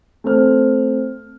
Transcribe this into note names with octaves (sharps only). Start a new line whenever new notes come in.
A3 C4 F6